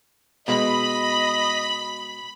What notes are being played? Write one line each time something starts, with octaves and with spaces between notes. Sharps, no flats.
B2 G#3 D#5 B5